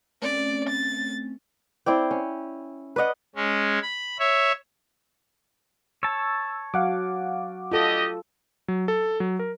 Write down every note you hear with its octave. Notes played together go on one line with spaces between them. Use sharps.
A3 C4 C#4 D5
A6
C4 E4 D5 G5
C#4
B4 D5 D#5 F#5
G#3 C#4
B5
C#5 E5
C#5 A5 E6
F#3 F5 F#5 D6
D4 F4 G4 A4 D#5
F#3
A4
F#3
A#4